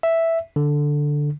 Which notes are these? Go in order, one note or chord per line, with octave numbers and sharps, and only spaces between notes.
E5
D3